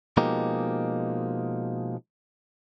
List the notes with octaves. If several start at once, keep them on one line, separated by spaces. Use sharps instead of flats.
B2 F3 G#3 A#3 D#4 G4